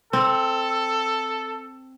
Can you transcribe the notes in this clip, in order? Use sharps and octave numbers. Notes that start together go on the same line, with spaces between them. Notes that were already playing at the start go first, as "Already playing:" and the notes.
C4 A4